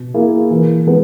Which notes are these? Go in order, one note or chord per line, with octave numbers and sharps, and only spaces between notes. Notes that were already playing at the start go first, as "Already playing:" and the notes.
Already playing: B2
A#3 E4 G#4
E3
G#3 B3